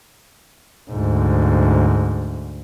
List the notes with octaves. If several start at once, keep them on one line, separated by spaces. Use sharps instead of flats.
D2 G#2